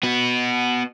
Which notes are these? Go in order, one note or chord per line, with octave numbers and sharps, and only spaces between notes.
B3 F#4